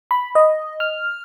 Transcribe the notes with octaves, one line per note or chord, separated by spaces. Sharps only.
B5
D#5
F6